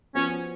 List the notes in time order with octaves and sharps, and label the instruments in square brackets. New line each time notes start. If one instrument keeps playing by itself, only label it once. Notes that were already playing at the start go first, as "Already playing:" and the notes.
[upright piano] F3 B3 F#4 [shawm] C#4